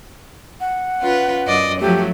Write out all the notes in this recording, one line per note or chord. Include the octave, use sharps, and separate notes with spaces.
F#5
C#4 F4 B4
F#2 D5 D#5
F3 F#3 A3 G4